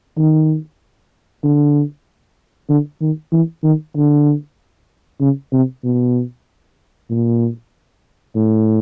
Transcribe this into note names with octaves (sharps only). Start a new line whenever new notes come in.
D#3
D3
D3
D#3
E3
D#3
D3
C#3
C3
B2
A#2
A2